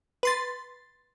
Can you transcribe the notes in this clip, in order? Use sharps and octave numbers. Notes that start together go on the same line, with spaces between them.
B4 C6 A6